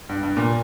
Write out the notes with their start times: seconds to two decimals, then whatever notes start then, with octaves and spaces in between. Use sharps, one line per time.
0.09 G2
0.23 G2
0.37 A#2